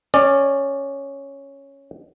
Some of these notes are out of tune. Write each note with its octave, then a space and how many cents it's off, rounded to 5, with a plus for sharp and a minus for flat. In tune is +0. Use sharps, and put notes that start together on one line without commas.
C#4 +0 D5 +20